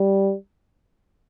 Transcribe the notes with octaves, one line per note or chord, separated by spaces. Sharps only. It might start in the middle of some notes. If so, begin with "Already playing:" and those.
Already playing: G3